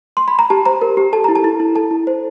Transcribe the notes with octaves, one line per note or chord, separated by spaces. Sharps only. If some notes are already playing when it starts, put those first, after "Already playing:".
C6
B5
A#5
G4 A5
C5 A#5
A#4
G4
A4 A5
E4 A#5
A5
E4
E4
A4 A5
E4
C5